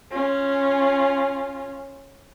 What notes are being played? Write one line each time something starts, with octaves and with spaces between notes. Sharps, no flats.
C#4 F4